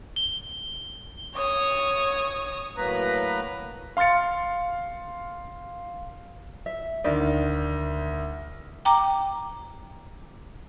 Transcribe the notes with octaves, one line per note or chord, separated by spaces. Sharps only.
G7
C#5 D#6
A2 F#3 A#3 B4 A#5
F5 C6 F6 A6 C#7
E5
D2 D#3 D5
G5 A#5 D6